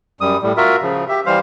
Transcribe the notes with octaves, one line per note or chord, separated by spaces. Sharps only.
F#2 G3 D#6
A2 G3
F4 F#4 A#4 E5
C#3 F3
G4 E5
E3 G3 C5 F5